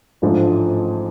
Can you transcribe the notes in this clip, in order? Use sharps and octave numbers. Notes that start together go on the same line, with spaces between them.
A1 G#2 F3 A3 D4